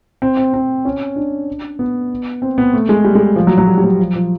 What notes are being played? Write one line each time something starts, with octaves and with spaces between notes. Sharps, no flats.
C4
C4
C4
C#4
D4
B3
C4
B3
A3
G#3
G3
G#3
F3
F#3
F#3
G3
G3
F#3
F3
F3